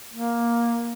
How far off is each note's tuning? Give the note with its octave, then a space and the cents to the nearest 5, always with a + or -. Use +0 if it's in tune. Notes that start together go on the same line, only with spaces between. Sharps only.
A#3 +10